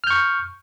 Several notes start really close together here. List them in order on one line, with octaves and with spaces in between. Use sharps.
F6 G6 C#6